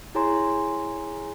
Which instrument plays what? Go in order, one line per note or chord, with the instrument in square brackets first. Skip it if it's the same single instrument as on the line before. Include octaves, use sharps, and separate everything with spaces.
[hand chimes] E4 G#4 C#5 G#5 A#5 C6